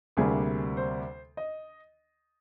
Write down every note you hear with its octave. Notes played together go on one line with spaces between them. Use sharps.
D2 C3 G3 A#3 G#4
C5
D#5